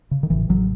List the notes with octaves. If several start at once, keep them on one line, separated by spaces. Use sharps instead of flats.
C#3
D#3
A1 E3
A1 F#3